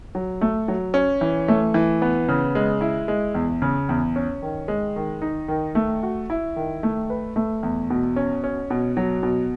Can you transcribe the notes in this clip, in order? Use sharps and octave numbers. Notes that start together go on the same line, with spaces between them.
F#3
A3
F#3
C#4
E3
A3
E3
B3
C#3
G#3
E4
G#3
E2
C#3
E2
C#4
D#3
G#3
D#3
D#4
D#3
A3
F#4
E4
D#3
A3
B4
A3
E2
B2
C#4
C#4
B2
F#3
B2